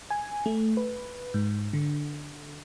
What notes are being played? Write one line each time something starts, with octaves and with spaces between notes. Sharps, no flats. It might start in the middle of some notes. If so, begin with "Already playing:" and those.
G#5
A3
B4
G#2
D3